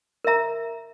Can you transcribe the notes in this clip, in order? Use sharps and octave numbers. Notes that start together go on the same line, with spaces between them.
A#4 E5 A#5